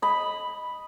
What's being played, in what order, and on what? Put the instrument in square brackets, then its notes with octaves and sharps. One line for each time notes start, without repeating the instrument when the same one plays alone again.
[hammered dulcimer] D#5 B5